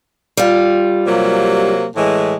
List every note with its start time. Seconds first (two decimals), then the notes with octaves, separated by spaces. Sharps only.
0.37 G3 F4
1.06 C3 F#3 A#3
1.96 A2 E3 G#3